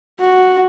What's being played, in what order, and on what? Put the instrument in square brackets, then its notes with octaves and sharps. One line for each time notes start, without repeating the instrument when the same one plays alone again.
[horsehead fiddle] F#4